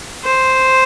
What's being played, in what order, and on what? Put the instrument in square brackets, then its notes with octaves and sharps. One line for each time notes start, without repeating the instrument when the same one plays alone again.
[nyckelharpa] C5